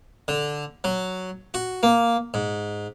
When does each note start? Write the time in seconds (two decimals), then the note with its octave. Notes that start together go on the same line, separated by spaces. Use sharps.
0.28 D3
0.84 F#3
1.54 F#4
1.83 A#3
2.34 G#2